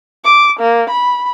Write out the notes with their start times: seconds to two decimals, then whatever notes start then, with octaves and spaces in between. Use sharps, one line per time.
0.24 D6
0.60 A#3
0.90 B5